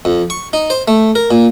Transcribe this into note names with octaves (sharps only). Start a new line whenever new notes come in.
F2
C#6
D#4
C5
A3
A#4
A#2